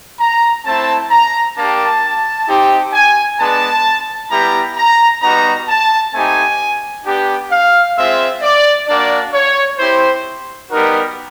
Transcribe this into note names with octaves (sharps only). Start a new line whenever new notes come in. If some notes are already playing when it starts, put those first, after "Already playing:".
A#5
A3 C4 E4 A5
A#5
A#3 D4 G4 A5
C4 D#4 G4
G#5
G#3 B3 D4 A5
G3 B3 E4 G4 A#5
A#5
G3 B3 D#4 F#4 A#5
A5
A3 C4 D#4 G4 G#5
B3 D4 G4
F5
G#3 C4 F4 E5
D5
A#3 D4 F#4 D5
C#5
C4 E4 G4 C5
G3 B3 D#4 F#4 A#4